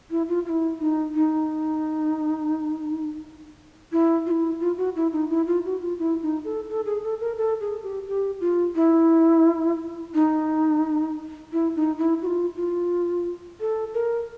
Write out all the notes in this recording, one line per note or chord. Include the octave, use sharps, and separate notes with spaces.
E4
F4
F4
E4
D#4
D#4
E4
F4
E4
F4
F#4
E4
D#4
E4
F4
F#4
F4
E4
D#4
A4
A4
G#4
A4
A#4
A4
G#4
G4
G4
F4
E4
D#4
E4
D#4
E4
F#4
F4
F4
A4
A#4